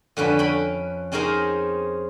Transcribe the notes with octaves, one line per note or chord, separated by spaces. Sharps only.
F2 D3 C#4 B4
C#4 G5 B5
C4 C#4 D#4 G#4 A#4 C5